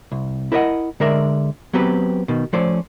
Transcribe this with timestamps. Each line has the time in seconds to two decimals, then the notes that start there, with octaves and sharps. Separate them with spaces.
0.12 C2
0.52 E4 A#4 C5 D5 D#5 F#5
1.00 D3 G#3 A#4 D5 E5
1.73 F#3 B3 C4 G4 B4
2.28 B2 D#3
2.53 F3 A3 C#4 C5 D5